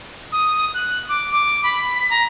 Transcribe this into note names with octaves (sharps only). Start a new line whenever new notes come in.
D#6
F#6
D6
D6
B5
B6
A#5